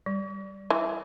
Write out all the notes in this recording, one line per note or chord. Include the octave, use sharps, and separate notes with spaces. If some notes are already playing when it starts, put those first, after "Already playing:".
G3
E3